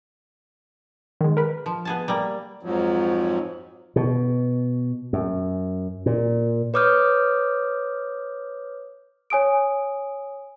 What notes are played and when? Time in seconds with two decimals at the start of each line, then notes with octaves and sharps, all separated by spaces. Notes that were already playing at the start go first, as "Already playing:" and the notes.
1.21 D#3 G#3
1.37 A#4 B4
1.66 F3
1.85 B3 G#4 A5
2.08 G3 A#3
2.63 F2 G#2 F3 F#3
3.96 B2
5.13 F#2
6.06 A#2
6.74 B4 C#5 D6 D#6 F6 G6
9.30 C#5 G#5 D#6 D7